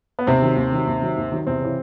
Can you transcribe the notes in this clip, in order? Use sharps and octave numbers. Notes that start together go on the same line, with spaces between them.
B3
D#2 C3 C4
D#3 F#3
D#2
D#3 F#3
D#2
D#3 F#3
D#2
D#3 F#3
E2 C3 C4
C#3 E3